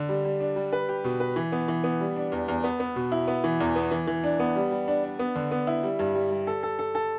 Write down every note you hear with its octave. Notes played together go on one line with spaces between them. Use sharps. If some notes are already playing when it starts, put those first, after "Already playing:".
Already playing: D3
G3
G3
D4
G3
B4
G4
B2
B4
E3
B3
E3
B3
G3
D4
E2
E2
B3
B3
B2
E4
B3
E3
E2
B3
E3
E3
D4
B3
G3
G3
D4
D4
B3
D3
B3
E4
G3
G2
G3
G3
A4
A4
A4
A4